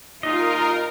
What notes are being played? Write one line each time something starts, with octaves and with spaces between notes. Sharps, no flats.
D#2 A#2 D#4 F4 A#4 D#5